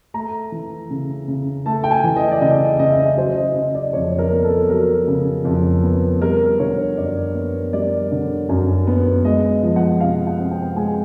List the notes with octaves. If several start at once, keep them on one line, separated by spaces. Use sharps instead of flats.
A3 A#5
E3
C#3
C#3
A3 A5
G5
G#5
E3
D#5
D5
C#3 D#5
C#3 D#5
E5
D#5
F#3 C5
D#5
C#3 D#5
D5
F2 C#5
A#4
B3
A4
F#3 A#4
C#3
F2
B3
G3 A#4
D3 C#5
F#2 D5
B3
G3 D5
D3
F#2
B3
G#3 D#5
F3
F#5
C3 F5
F#5
C4
G5
G#3 G#5